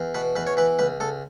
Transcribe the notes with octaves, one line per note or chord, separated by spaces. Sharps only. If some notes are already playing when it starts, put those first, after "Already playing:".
Already playing: E2
B2 B4
E2 B4
C#5
E3 B4
C#2 B4
C#2 A4